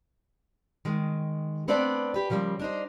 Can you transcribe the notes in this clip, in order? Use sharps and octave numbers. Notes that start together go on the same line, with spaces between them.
D#3 G#3
A3 B3 C4 D4 B4 D5
G4 B4
C#3 F3 G3 G#3 A#3
D4 D#4 C5